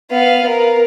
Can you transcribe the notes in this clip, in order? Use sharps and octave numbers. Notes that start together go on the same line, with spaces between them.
B3 F5
A#4